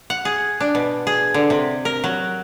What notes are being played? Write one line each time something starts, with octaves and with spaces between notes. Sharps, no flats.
F#5
G#4
D4
B2
G#4
D3
C3
A#4
F#3